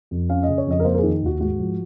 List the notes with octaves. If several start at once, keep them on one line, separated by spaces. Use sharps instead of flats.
F2
C#4 F5
C#3 D#5
C#5
F2 D#5
A#4
A#3 C5
A#4
G#4
D#3
D#2 F#4
G#2 F#4
F3